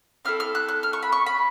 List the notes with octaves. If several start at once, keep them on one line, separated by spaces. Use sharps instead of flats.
C4 E4 A4 F6
F6
F#6
F#6
F6
C#6
B5
C#6
B5